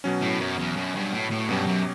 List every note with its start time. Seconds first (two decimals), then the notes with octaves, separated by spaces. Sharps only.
0.04 B2 F#3 C#4
0.21 A2
0.40 F#2
0.58 E2
0.76 F#2
0.95 G2
1.13 A2
1.31 A2
1.49 G2 B2 F#3 C#4 G4
1.66 F#2